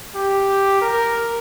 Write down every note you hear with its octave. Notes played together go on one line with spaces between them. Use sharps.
G4
A#4